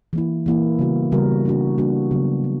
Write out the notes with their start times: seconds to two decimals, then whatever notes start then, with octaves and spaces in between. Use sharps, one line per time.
0.13 E3 A#3 E4
0.46 E3 A#3 E4
0.79 C#3 G3 B3 F#4 A#4
1.12 C#3 G3 B3 F#4 A#4
1.45 G3 A#3 D4 F#4
1.78 G3 A#3 D4 F#4
2.11 C#3 F#3 B3
2.44 C#3